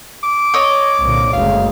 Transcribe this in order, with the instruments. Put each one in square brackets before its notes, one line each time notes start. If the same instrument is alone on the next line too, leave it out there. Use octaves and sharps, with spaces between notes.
[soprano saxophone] D6
[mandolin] C#5 D#5
[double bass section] C2 A#2 D3
[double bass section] F#1 D2 G#3 [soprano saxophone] F5